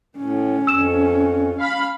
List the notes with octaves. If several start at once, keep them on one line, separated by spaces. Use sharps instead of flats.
A2 C#4
F2 E6 E7
F5 B5